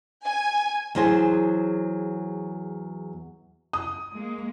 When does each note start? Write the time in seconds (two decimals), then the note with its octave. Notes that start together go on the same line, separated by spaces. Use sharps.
0.22 G#5
0.95 E2 F#3 G#4 C5 G#5 A5
3.73 D#6
4.14 G#3 A#3